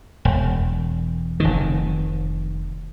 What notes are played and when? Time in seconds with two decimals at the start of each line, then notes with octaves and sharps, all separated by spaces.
0.25 E1
1.40 F1 D#3